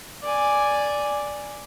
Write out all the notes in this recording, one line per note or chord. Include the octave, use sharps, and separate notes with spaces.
D5 G#5